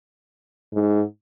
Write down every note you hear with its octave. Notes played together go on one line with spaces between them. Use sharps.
G#2